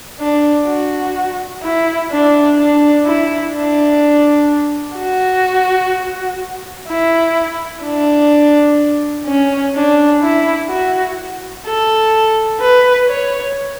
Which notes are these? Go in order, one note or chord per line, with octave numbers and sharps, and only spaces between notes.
D4
F#4
E4
D4
D4
E4
D4
F#4
E4
D4
C#4
D4
E4
F#4
A4
B4
C#5